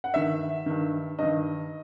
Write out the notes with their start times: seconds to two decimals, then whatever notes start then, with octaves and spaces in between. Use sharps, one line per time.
0.04 F#5
0.14 G2 D#3 E5
0.66 G2 D#3
1.18 G2 D#3 D#5